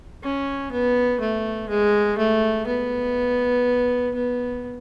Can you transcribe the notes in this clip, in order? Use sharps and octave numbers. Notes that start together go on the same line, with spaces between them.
C#4
B3
A3
G#3
A3
B3
B3